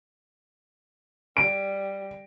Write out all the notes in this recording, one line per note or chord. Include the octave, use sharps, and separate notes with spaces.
G3 D7